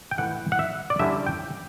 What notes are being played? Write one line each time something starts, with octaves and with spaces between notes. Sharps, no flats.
G5
A2 E3 A3 E4 F#5
F#5
E5
D5
D3 G3 C#4 E4 E5
G5